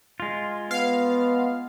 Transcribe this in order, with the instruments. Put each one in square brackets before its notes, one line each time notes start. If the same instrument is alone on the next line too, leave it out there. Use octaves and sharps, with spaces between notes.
[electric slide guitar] G#3 F4
[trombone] B3 [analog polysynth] F5